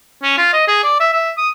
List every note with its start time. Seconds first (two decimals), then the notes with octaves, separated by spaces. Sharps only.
0.23 C#4
0.38 F4
0.53 D#5
0.68 G#4
0.83 D5
1.00 E5
1.13 E5
1.37 D#6